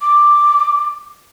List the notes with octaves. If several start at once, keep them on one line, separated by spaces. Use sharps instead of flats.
D6